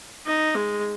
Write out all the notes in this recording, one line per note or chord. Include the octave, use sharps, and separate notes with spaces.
D#4
G#3